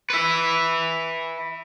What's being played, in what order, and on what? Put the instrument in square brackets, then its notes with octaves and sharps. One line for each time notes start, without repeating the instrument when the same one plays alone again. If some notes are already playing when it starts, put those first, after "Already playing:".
[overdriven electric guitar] B4 E5